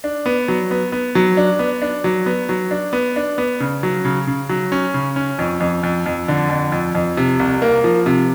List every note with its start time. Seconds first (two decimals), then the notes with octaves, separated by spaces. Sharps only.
0.04 D4
0.26 B3
0.48 F#3
0.71 B3
0.92 B3
1.15 F#3
1.37 D4
1.59 B3
1.82 D4
2.04 F#3
2.26 B3
2.49 F#3
2.71 D4
2.93 B3
3.16 D4
3.38 B3
3.60 C#3
3.83 F#3
4.05 C#3
4.27 C#3
4.49 F#3
4.72 C#4
4.94 C#3
5.16 C#4
5.39 F2
5.60 F2
5.83 F2
6.06 F2
6.28 D3
6.50 F2
6.72 F2
6.95 F2
7.17 C3
7.39 C2
7.62 A#3
7.84 F3
8.06 C3